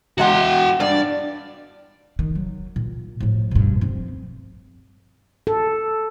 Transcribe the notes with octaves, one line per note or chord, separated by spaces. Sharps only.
E2 G#3 F#4 F#5 G5
G2 D5
D#3
F#3
A#2
A2 F3
G2 B2
F3 C4
A4